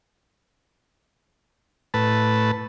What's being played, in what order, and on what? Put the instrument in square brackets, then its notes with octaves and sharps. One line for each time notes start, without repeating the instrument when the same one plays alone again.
[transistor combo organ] A2 B4 A5